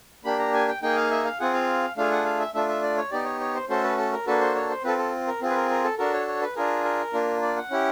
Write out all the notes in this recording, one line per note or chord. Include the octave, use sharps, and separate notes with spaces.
A#3 D4 G4 B5
A#5
G#5
G5
A#3 D#4 G#4 G5
F5
E5
F5
C4 F4 G#4 F#5
F5
A3 D4 F4 G#4 F5
F#5
F5
E5
A3 D4 F4 E5
E5
D5
C#5
B3 D#4 G4 D5
C#5
C#5
C5
A3 C#4 F#4 A4 C5
B4
A4
A#4
A#3 D4 F#4 A4 B4
C5
C#5
C5
C4 F4 A4 B4
A4
A#4
C4 F4 G#4
B4
A#4
A#4
A4
D4 F#4 A4 A#4
C#5
C#5
B4
D4 F4 G#4 A#4
A#4
A#3 D4 F4
D5
F#5
C#4 E4 G4